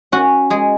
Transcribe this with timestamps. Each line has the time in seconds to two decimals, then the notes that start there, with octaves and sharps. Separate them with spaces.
0.12 C#4 F#4
0.50 G#3 G#4